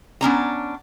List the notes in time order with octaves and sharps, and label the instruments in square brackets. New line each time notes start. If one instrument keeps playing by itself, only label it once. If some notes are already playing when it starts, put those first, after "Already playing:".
[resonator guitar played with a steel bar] B3 C#4 D4 A#5